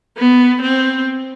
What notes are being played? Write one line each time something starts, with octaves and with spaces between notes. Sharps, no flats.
B3
C4